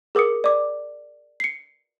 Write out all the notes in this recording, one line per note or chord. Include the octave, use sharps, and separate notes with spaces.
G#4 A#4 D6 D#6 C#7
D5 D6
C7 C#7